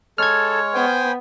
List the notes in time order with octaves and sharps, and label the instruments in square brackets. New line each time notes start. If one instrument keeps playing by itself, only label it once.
[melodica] G#3 C#5 [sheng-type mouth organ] A4 [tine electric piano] F6 G#6
[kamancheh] B3 [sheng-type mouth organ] C5 G5 G#5